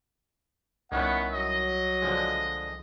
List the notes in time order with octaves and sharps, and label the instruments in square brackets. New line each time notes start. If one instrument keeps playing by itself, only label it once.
[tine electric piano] C2 [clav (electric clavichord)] D#3 C#4 E4 [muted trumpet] B3 [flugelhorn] F#5
[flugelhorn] F#3 [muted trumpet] D#5
[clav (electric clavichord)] D3 F3 G#3